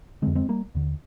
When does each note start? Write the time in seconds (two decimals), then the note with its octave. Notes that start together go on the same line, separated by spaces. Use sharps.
0.22 D3 G#3 C4
0.27 F2
0.35 G#3 C4
0.49 G3 A#3
0.75 D#2 D3